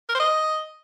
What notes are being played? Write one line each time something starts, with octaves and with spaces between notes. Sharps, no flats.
A#4
C5
D#5